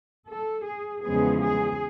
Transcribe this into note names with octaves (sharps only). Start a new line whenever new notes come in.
A4
G#4
E2 C#3 F3 G#3 B3 G#4
G#4